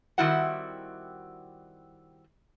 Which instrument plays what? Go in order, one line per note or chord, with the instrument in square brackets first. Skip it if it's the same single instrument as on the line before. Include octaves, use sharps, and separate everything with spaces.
[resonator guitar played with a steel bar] D#3 G3 C4 E4 F#4 F#5